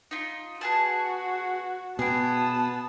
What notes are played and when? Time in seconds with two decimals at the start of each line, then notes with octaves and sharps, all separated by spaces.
0.11 D#4 F4
0.61 B3 F#4 G#4 A5
1.99 B2 B3 G#4 G5 A5